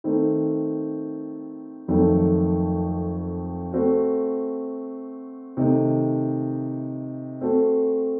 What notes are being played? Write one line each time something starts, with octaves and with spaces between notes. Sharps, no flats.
D#3 A3 C4
F2 D#3 F#3 A3
A3 C4 F#4
C3 D#3 A3 D#4
A3 C4 F#4 A4